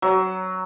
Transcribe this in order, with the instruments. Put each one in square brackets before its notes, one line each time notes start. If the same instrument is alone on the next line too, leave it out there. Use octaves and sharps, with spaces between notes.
[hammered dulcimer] F#3